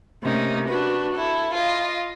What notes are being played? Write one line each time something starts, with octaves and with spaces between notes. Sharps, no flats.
C3 A3 A#3 C#4 D#4
D4 F#4 B4
E4 A4
F4 D#5